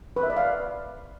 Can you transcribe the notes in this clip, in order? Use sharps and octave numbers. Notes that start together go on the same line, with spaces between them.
B4
E5
D5
F5